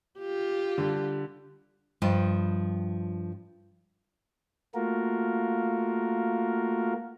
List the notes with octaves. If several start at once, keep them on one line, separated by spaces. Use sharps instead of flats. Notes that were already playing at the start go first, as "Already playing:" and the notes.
F4 G4
D3 G3
G2 F3 D#5 G5
A3 A#3 F4 F#4 A#4